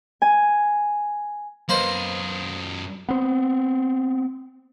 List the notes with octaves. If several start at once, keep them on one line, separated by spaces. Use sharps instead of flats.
G#5
F#2 A#3 B4 C5 D#5
B3 C4